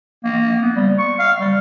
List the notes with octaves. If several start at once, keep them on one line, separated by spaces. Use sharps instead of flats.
A#3
B3
G3
C#6
F5
G3